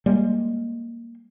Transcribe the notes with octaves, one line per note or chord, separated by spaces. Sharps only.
G3 G#3 A#3